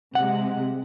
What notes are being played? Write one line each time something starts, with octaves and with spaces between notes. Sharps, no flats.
C3 G#3 F#5